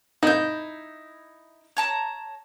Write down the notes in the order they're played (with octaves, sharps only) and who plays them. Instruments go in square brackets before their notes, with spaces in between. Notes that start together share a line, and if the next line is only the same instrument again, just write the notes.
[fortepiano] D#4 [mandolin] E4 G6
[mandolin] C#5 A5 A#5